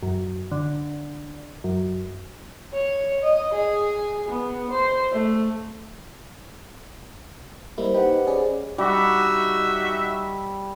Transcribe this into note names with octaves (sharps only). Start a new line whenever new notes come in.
F#2
D3
F#2
C#5
D#5
G#4
B3
C5
A3
G3 A#3 E4 C5 D#5 B5
D#4 G4 B4 F#5
C#4 G#4 D5
G3 D#4 F#4 E5